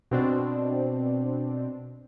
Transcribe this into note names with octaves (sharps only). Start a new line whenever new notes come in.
B2 C4 D4